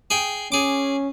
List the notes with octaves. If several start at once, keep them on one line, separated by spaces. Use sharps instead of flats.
G#4 G5
C#4 G#4 D6